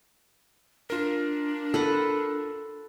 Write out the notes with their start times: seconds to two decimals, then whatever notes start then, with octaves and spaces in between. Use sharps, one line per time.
0.90 D4 F4 A#4
1.74 A4 B4 F#5